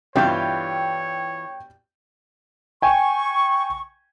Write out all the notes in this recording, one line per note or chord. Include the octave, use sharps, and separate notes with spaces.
G2 B2 E3 G3 F4 C#5 G5 G6
G5 G#5 C#6